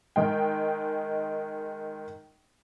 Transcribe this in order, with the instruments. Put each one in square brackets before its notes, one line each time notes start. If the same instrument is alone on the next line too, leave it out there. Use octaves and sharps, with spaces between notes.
[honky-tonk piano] D#3 G#3 G5